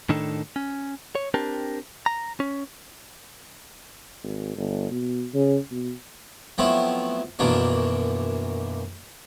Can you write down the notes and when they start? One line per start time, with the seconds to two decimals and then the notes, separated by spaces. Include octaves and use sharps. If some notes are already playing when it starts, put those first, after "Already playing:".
0.09 A2 D#3 D4 D#4 A4
0.56 C#4
1.15 C#5
1.34 C4 D4 G4 A#4 A5
2.06 A#5
2.40 C#4
4.23 G#1
4.57 G1
4.91 B2
5.34 C#3
5.72 B2
6.58 F3 F#3 A3 B3 C4 E4
7.39 F#2 B2 E3 F3 A#3 D4